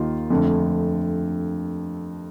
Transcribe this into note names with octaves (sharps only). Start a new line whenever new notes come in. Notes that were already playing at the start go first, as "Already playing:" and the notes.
Already playing: D#2 D#3 A#3 F4
F2 D3 A3